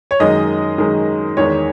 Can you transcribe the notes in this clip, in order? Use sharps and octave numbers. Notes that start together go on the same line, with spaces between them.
C#5
F#2 D#3 G#3 D#5
F#2 D#3 G#3
E2 D#3 G#3 C#5